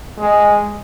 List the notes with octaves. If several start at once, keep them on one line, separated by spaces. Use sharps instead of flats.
G#3